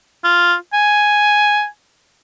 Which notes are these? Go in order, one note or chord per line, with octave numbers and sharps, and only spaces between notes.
F4
G#5